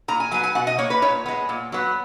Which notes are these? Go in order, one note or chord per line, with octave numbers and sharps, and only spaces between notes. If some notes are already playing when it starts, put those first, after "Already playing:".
A#2 A#5
G#5
F#3 B3 G#5
G#5
B2 F#5
D#5
A#3 C#5
B4
A#2 C#5
G#3 B3
A#2
F#3 B3